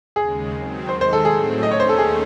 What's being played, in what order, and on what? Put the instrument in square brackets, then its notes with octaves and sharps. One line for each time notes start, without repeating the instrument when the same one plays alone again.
[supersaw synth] D#2 C#3 G#3 [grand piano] G#4
[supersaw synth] D#3 F#3 C4
[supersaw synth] D#2 D#3 G#3 [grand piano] C5
[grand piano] C5
A4
[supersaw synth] A2 F#3 A3 C4 [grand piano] G#4
[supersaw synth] D#2 D#3 A3 C#4 [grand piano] D#5
[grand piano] C#5
C5
A4
G#4